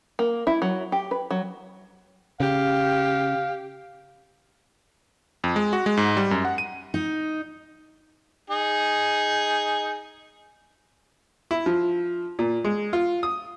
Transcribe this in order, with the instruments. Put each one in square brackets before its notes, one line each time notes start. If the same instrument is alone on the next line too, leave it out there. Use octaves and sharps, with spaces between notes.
[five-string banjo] A#3
E4
F#3
G4
B4
F#3
[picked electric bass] C#3 [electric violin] G4 [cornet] F5
[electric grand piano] F2
G#3
F#4
G#3
G#2
G3
F#2
F#5
D#7
[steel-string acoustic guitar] D#4
[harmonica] D#4 G#4
[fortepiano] E4
F3
A#2
G#3
F4
D#6